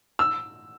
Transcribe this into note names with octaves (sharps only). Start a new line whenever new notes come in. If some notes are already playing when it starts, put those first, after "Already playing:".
E6